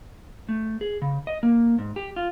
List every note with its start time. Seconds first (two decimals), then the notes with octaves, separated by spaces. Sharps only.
0.49 A3
0.81 G#4
1.02 C#3
1.27 D#5
1.43 A#3
1.78 G#2
1.96 G4
2.16 F4